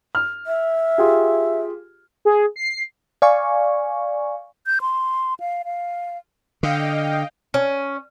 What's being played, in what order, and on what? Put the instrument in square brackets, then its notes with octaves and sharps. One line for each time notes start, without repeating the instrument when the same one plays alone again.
[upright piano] F6
[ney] E5
[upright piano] F4 G4 G#4
[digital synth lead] G#4
C7
[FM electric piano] D5 F5 G#5 C#6
[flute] G6
C6
F5
F5
[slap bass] D3 [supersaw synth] D#5 F5 G5
[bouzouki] C#4